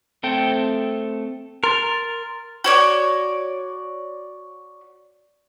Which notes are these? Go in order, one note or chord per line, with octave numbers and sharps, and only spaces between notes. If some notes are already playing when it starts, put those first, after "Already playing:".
A3 C4 A4 C5 G5
A#4 C6 A6
F#4 C#5 D5